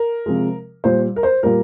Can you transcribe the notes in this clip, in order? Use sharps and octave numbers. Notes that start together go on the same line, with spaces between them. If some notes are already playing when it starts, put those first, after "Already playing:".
Already playing: A#4
C3 F3 G#3
A#2 G3 C5
A#4
C5
A#2 G3 A#4